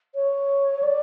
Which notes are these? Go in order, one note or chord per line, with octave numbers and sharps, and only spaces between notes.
C#5
D5